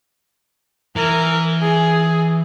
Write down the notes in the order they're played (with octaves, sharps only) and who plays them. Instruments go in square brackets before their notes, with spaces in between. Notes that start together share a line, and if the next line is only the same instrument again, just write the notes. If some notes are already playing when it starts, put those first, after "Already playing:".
[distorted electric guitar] E3 [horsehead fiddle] A#4
[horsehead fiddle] G#4